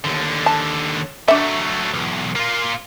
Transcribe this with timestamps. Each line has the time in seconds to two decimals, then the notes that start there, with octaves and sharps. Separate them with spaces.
0.04 D#2 D3
0.46 A5
1.28 F#3 A3 D4 E5
1.94 B1 E2
2.36 A#3 F4